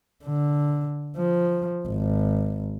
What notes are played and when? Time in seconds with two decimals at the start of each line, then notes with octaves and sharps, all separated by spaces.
0.24 D3
1.17 F3
1.88 G#1